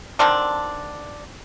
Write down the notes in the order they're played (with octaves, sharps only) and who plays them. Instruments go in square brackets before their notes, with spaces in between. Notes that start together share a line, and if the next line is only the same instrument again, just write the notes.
[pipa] D3 D#3 C4 D4